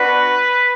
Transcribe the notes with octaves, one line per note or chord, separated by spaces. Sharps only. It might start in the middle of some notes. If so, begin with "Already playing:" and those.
Already playing: B3 D4 F#4 B4